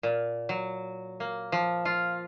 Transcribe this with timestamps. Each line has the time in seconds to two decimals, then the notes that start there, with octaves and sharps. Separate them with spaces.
0.03 A#2
0.49 F#3
1.20 A#3
1.52 F3
1.85 F4